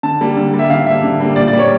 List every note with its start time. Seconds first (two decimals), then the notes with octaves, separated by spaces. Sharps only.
0.03 D3 A5
0.21 G3 A#3
0.37 D3
0.53 G3 A#3
0.59 E5
0.70 D3 F5
0.86 G3 A#3 E5
1.03 D3
1.20 G3 A#3
1.36 A#2 D5
1.48 D5
1.53 G3 A#3
1.59 C#5